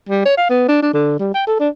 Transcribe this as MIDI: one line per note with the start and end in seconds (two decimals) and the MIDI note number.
0.09 0.25 55
0.25 0.34 73
0.37 0.49 77
0.50 0.67 59
0.68 0.82 62
0.82 0.90 62
0.94 1.17 50
1.19 1.34 55
1.34 1.43 79
1.47 1.56 69
1.60 1.69 62